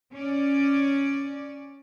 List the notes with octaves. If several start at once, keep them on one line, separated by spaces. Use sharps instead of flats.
C#4 D5